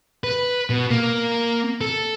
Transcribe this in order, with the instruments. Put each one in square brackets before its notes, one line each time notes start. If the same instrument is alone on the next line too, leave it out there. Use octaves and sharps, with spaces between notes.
[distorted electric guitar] B4
B2
A#3
A4